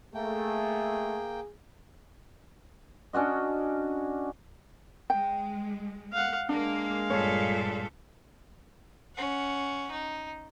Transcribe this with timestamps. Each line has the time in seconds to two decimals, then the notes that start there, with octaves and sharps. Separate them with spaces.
0.14 A3 A#3 G#4 G5
3.13 C#4 D4 F#4 D#5
5.10 G#3 G5
6.13 F5 F#5
6.49 G#3 A#3 D4 F5
7.10 G2 A#2 A4 C#5
9.16 C#4 F#5
9.91 D#4